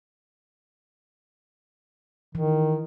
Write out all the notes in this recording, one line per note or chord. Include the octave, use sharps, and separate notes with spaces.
D#3 E3